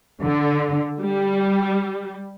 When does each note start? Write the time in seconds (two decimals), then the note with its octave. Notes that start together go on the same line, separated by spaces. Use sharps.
0.22 D3
1.01 G3